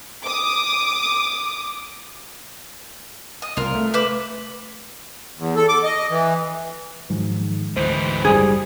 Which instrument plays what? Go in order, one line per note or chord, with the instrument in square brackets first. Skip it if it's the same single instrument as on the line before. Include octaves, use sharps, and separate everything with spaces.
[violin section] D6 D#6
[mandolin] D#5
[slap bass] C2 [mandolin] F4 A#4
[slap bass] A3
[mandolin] B4 E5 D6
[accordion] E2
A4
D6
D#5
E3
[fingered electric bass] G#2 [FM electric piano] D#3 F3 F#3
[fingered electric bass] D2 [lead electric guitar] G#2 E3 [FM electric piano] C5
[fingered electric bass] F#1 G3 [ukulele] G#4